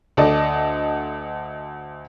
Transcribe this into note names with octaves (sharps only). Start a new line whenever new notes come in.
D2 A4 D5 D#5